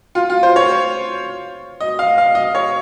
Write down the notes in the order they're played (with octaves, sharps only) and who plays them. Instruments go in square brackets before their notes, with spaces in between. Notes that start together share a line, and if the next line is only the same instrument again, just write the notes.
[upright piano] F4
F4
C5
C#5
D#5
F5
F5
D#5
C#5